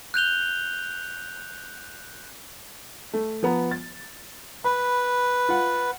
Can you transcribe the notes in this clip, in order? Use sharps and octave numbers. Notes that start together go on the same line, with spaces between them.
F#6 G6 F7 G7
A3
F3 B3 A#5
A6
B4 B5
F4 F#5